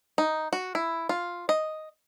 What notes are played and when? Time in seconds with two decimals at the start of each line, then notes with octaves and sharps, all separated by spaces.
0.18 D#4
0.53 F#4
0.75 E4
1.09 F4
1.49 D#5